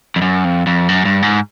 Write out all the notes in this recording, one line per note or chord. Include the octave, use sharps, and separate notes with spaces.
F2
F#2
F2
F2
F#2
G2
G#2